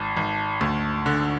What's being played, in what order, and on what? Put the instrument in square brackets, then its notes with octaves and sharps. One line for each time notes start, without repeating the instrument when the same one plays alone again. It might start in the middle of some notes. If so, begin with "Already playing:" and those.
Already playing: [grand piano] G#1 A5
G#1
D2
D3